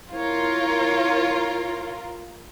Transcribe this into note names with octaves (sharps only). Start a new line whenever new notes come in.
E4 F4 A#4 C#5